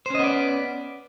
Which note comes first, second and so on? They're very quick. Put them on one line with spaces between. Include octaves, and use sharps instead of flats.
C5 C#4 D#5 B3 D5